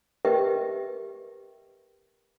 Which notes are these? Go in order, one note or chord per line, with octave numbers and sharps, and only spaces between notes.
G4 A#4 B4 D#5 E5 G5